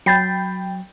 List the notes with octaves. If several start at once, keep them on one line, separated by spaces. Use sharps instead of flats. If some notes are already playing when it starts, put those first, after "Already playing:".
F#3 G5 B5 G6 A6 C7